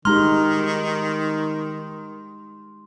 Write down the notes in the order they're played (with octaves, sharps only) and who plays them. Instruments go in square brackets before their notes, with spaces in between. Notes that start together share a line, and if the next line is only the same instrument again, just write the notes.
[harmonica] D#3 [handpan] G#3 D#4 G4 [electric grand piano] A#5 F6 [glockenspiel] C6